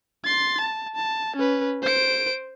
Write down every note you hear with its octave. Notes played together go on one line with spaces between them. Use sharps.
C6 A6
A5
A5
C#4 B4
C5 D7